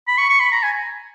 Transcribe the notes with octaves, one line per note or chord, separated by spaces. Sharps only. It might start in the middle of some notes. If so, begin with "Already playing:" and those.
B5
C#6
C#6
B5
A#5
G#5